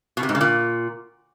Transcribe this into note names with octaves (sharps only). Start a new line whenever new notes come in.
B2
C3
G#2
C#3
A#2